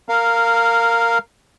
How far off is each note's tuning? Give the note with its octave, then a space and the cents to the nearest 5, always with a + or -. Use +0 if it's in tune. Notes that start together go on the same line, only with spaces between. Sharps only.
A#4 -15 F5 +0